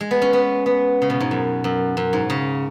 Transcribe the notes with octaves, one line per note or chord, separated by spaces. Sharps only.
G#3
B3
C#4
B3
B3
C#3
B2
G#2
F#2
F#2
F#2
G#2
C#3